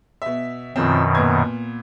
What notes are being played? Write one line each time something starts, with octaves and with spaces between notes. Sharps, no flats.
B2 E5
F#2 B2 D#3 F3 C4
A#2 B3 G#6